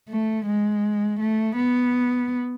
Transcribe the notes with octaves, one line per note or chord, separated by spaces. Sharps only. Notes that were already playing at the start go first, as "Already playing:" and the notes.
A3
G#3
A3
B3